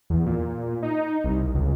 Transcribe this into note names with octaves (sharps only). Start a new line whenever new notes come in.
E2
A#2
D#4
C2
C#2